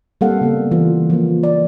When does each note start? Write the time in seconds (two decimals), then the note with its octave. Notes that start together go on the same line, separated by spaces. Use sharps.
0.21 G3 A#3 C4 A4 F5 F#5
0.41 C#3 A#3 B3
0.71 E3 F4
1.10 F3 A#3
1.43 D5